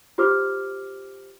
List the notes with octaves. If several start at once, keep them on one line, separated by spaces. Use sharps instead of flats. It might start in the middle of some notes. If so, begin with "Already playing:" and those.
F4 G4 C5 D6 F6